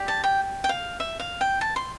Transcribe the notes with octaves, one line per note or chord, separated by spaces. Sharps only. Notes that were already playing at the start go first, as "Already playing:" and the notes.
Already playing: G4 D5
A5
G5
G5
F5
E5
F5
G5
A5
C6